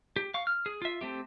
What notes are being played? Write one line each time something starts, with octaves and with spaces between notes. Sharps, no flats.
G4
F5 C#6
F6
G#4
F4 E5
A3 C4 G4